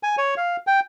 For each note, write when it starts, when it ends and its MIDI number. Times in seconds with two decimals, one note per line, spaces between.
0.03 0.16 80
0.18 0.35 73
0.37 0.57 77
0.67 0.80 79